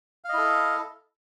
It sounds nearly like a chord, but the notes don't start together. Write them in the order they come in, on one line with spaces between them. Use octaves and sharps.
F5 D#5 E4 A4